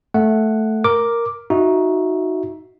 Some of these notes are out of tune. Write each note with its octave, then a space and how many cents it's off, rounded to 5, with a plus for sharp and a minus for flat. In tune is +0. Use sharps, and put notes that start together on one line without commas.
A3 -5 F#5 +0
A#4 +0 D6 +0
D#4 +15 F#4 -5 E5 +0